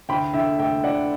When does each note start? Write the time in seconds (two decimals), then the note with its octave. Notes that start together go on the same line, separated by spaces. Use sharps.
0.09 D2 G5 B5
0.34 D3 E5 G5
0.59 A3 E5 G5
0.84 D2 D5 F#5